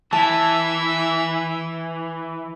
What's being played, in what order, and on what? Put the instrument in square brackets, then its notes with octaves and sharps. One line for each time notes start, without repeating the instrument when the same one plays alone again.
[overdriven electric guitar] E3 [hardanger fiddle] E5 [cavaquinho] A5